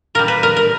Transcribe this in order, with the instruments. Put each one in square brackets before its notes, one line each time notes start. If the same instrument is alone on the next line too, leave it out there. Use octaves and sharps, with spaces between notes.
[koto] A#2 G3 A#4
B4
A#4
A#4